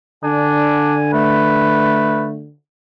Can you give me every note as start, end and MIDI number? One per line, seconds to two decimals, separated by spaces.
0.23 2.55 50
0.23 0.96 62
0.23 1.13 80
1.13 2.44 57
1.13 2.26 71